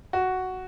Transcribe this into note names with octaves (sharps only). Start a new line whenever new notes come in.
F#4